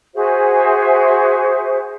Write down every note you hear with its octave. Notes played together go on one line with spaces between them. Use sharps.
F#4 G#4 C5 E5